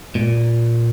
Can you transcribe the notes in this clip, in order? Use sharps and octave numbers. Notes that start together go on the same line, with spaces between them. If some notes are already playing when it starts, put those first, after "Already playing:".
A#2